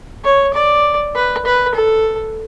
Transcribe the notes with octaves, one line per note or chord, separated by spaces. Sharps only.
C#5
D5
B4
B4
A4